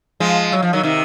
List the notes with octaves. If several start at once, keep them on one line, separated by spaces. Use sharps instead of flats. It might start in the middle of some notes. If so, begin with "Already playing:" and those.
F3 G#3
F#3
F3
D#3 F#3
C3 D#3